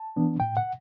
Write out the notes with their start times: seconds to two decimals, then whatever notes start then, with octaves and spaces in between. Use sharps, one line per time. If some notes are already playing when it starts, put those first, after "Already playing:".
Already playing: A5
0.16 E3 B3 D4
0.40 A2 G5
0.57 F#5